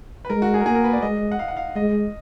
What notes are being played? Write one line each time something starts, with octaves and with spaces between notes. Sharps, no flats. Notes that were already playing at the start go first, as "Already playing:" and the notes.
B4
G#3 A#4
F#4
G#4
A#4
A#3 G#4
A#4
B4
D5
G#3 D#5
F#5
F5
F#5
F5
G#3 D#5